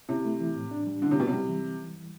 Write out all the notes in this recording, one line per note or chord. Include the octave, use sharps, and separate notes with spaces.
C3 E4
A3
E3
A2
D4
G3
D3 E4
C3
B2 C4
C3
G3
E3